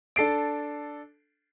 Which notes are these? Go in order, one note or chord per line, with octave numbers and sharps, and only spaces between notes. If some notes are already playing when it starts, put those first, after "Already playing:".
D4 A4 C7 D7